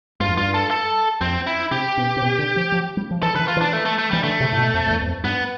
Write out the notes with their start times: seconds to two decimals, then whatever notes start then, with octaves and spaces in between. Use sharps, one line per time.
0.20 G2 F4
0.28 F2
0.37 G2 F4
0.54 A4
0.71 A4
1.21 F2 C4
1.47 E4
1.71 C3 G4
1.97 B2
2.17 C3
2.22 B2
2.39 D3
2.56 F3
2.72 F3
2.97 G3
3.11 F3
3.23 E3 A4
3.35 D3 E3 B4
3.48 F4
3.57 E3 D4
3.73 A3
3.85 A3
3.98 A3
4.11 E3 G3
4.23 D3 A3
4.40 C3
4.53 A2
4.58 B2
4.74 F2
4.86 F2
4.90 E2
5.02 E2
5.07 F2
5.24 G2 B3